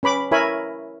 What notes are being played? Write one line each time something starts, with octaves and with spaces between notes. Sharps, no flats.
C#4 B4 B5 D6
E4 A#4 C#5 E5 G#5 B5